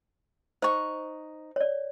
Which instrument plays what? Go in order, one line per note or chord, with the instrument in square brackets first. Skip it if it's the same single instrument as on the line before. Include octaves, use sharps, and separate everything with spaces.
[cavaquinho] D#4 C#6 [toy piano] C5
[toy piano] C#5 D5